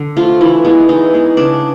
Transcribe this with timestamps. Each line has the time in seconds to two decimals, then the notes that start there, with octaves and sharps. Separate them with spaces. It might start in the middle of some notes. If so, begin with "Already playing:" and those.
Already playing: D3
0.17 F3 A3 F4
0.41 E3 E4
0.65 G#3 B3
0.89 E3 D#4
1.13 G#3 B3
1.37 C#3 D4